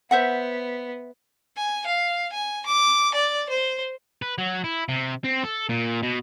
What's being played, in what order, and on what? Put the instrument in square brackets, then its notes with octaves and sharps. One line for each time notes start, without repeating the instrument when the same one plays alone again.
[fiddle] B3 [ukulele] C5 E5 F#5
[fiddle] G#5
F5
G#5
D6
D5
C5
[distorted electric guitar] B4
F#3
E4
C3
C4
A4
A#2
B2